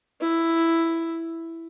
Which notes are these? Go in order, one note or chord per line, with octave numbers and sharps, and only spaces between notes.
E4